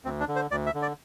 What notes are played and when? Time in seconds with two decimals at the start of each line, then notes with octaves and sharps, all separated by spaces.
0.05 D2 C4
0.20 D4
0.28 D3
0.36 C5
0.51 D2 D5
0.66 E5
0.74 D3
0.82 D5